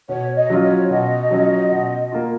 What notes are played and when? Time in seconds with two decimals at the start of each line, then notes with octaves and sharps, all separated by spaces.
0.08 B2 C#5
0.36 D#5
0.50 F#3 C#4 F4
0.63 C#5
0.90 B2 D#5
1.31 F#3 C#4 F4
1.71 B2
2.12 A#3 F4